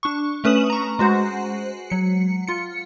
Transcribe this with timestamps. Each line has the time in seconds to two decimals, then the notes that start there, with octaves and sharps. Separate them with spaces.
0.03 D4 C#6
0.44 A3 C#4 B4 D#6 E7 F#7
0.70 A#5 C#6
0.99 G#3 F#4 C5 F#5
1.90 F#3 C#7
2.48 F4 C#7